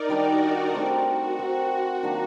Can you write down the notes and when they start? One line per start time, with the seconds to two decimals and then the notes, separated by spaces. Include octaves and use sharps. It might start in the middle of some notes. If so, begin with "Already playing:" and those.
Already playing: D#4 A#4 D5
0.09 D#3 G3 D4 F#4
0.74 A3 C4 G4 A#4
1.06 F#4
1.39 A3 C4 F#4 G4 A#4
1.71 F#4
2.03 D#3 F#3 A#3 D4